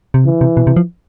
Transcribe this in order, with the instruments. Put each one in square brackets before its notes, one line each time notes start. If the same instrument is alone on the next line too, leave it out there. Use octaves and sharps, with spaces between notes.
[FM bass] C3
[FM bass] C#3 [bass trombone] E3
[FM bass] C3
B2
C3
F3